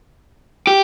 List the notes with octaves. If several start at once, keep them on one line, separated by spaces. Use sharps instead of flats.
G4